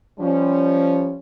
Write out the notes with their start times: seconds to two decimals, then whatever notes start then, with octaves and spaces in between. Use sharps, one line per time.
0.19 F3 G3 C#4